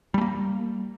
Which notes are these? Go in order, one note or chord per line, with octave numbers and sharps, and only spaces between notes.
G3 A3 A#3